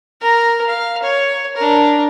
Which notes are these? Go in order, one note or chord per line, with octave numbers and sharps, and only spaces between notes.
A#4 A#5
F5
C#5
D4 A#4